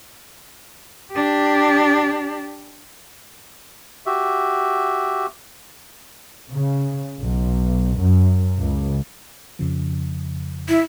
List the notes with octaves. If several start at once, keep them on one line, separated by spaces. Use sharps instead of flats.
D4 G4
F#4 G4 E5
C#3
B1
F#2
C#2
F2 C#3 F3
E4